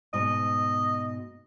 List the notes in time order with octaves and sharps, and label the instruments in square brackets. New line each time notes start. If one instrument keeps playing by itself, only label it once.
[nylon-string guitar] G#2 B2 [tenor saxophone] D#5